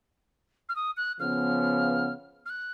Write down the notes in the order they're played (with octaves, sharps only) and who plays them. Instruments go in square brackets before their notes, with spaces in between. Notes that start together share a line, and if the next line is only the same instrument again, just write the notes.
[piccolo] F6
D#6
F#6
[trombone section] C#3 F3 B3 [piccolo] F6
[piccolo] F6
F#6